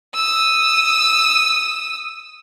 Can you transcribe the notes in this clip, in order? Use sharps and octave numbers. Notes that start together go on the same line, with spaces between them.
D#6 E6